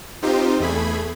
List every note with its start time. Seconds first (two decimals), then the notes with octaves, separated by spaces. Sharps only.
0.22 C4 D#4 F4 G4 C5
0.60 E2 A3 G#4 B5 G#6